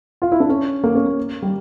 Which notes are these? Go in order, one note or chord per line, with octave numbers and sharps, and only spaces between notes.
F4
E4
D4
C#4
A#3
C#4
A#3
G3